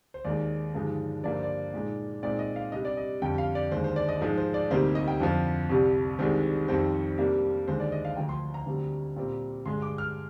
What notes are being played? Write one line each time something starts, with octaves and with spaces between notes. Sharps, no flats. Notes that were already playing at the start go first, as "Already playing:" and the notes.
C5
D#2 D#3 G#3 D#4 D5
G2 D3 F3 G#3 D#4
G2 D3 F3 A#3 D5
C5
D5
A#2 G#3 D#4
A#2 G#3 C4 D#4 D5
D#5
F5
C3 G3 D4 D#5
D5
D#5
F2 D3 G3 G5
F5
D5
D#2 D3 G#3 C5
C5
D5
D#5
G#2 F3 G#3
C5
D5
D2 C3 G3 A#3 D#4 C5
D#5
G5
F2 D3 F3
C2 C3 G3
C2 C3 D#3 G#3 D4 C5
F2 D#3 G3 C4 C5
C3 G3 A#3 D4
D#2 D3 G#3 C5
D5
D#5
F5
D2 D3 F3 G5
C6
A#5
D2 D3 G3 C4
A#2 G3 C4
G2 D3 G#3 C6
D6
F6